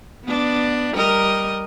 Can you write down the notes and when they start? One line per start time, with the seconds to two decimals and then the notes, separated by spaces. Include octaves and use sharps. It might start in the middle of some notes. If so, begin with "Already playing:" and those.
0.25 B3 D4
0.94 G3 A#4 D#5